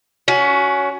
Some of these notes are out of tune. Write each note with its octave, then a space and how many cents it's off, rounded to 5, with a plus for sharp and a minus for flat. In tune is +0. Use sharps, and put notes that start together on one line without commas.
C#4 +20 F#4 +0